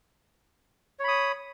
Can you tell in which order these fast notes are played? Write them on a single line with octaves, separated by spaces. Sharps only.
C#5 B5 D#6